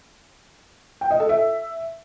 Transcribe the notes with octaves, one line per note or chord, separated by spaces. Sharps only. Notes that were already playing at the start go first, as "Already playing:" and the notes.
G5
D#5
A4
E5